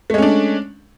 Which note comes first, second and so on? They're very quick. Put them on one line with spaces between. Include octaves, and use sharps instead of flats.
A3 G#3 C#4 D4